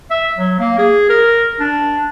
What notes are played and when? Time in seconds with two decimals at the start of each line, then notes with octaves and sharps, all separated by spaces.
0.11 E5
0.38 F#3
0.59 A#3
0.78 G#4
1.10 A#4
1.60 D4